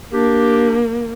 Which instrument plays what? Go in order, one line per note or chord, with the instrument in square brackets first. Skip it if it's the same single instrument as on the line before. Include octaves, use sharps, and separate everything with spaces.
[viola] A#3 [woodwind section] D4 G4